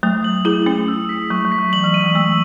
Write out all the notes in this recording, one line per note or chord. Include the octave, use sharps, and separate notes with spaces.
F#3 A3 D#6
F#7
E4 G#4 F#7
A3 C#4 F#7
E6
B6
F#3 A3 C#6
F#3
B6
F#3
E3 F#7
E3
F#3 D#7
E3 G#3
F#3 A3 E6